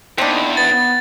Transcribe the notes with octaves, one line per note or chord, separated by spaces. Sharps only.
E2 A#3 C4 D4 D#4
B3 A6